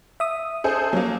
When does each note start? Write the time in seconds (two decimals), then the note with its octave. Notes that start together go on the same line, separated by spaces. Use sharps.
0.20 E5 D#6
0.64 G#4 A4 C5
0.93 F#3 A#3